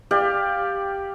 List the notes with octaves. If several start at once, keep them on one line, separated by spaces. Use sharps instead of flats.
G4 D5 F5